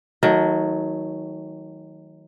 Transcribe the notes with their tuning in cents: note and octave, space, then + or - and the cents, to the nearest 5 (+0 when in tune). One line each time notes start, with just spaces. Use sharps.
D#3 +30 F#3 +0 A3 +0